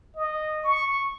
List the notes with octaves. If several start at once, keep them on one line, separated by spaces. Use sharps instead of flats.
D#5
C#6